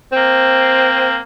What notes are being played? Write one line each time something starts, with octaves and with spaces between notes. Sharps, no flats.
A#3 C4